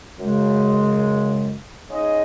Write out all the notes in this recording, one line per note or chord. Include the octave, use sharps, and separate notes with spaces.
F#2 C#3 G#3
C#3 G#3 D#4 G#4 D#5